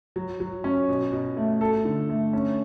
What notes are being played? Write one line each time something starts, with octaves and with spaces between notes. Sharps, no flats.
F#3
F#3
C#4
B2
B2
A3
A4
D3
A3
C#4